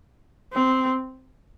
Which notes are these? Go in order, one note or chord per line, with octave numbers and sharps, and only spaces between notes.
C4